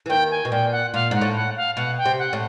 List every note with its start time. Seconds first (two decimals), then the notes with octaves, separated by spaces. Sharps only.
0.06 E3
0.09 D#2 D#3 G5
0.31 G#5
0.45 B2
0.51 A#2 G5
0.72 F#5
0.94 A#2 F5
1.11 G#2 F#5
1.21 A2
1.35 F#5
1.57 F5
1.77 B2 F#5
1.98 G5
2.06 C3
2.19 F#5
2.33 A2